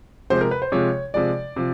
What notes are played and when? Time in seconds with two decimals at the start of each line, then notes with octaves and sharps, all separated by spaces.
0.30 C3 F3 G#3 C5
0.41 A#4
0.51 B4
0.62 C5
0.72 C3 F3 G#3 C#5
1.14 C3 F3 G#3 D5
1.56 C3 F3